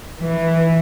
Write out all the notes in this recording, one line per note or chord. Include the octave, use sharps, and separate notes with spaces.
E3